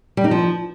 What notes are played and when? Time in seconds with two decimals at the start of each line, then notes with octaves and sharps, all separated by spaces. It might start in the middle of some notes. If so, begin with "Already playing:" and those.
0.17 G3
0.24 D#4
0.31 F3